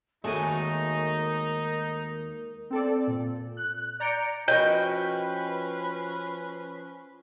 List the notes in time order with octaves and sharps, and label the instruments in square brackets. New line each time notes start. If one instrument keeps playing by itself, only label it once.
[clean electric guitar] D#2 F#4 G#5 [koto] G#3 A3 A4 [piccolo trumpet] D#4 [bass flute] A#4
[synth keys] C4 A4 D5
A#2
F#6
D5 A#5 G6 C#7 D7
[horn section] F3 C#4 B4 [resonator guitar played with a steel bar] F#4 A#4 D#5 [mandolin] G5